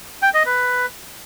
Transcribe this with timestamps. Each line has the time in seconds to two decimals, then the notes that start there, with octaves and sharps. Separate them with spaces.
0.22 G5
0.34 D#5
0.46 B4